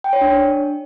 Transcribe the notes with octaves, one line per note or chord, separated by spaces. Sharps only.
G5
C#5
D4